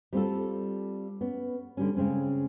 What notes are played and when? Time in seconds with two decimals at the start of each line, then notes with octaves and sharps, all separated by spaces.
0.13 G3 C4 F4 A4
1.21 B3 C#4
1.77 D3 G3 C#4
1.96 C#3 G#3 C4 C#4